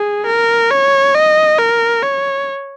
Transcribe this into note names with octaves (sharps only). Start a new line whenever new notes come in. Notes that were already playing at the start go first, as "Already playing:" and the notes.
Already playing: G#4
A#4
C#5
D#5
A#4
C#5